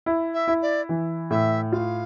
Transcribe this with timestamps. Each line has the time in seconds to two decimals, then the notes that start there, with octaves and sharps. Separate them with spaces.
0.06 E4
0.34 E5
0.48 E4
0.62 D5
0.89 E3
1.30 A2 E5
1.72 F4 F5